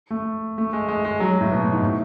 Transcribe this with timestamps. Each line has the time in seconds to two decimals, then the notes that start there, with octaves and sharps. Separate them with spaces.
0.11 A3
0.58 A3
0.73 G#3
0.88 G#3
1.05 G#3
1.20 F#3
1.41 A2
1.52 B2
1.62 A2
1.72 G#2
1.82 A2